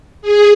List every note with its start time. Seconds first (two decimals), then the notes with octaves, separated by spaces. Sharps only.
0.22 G#4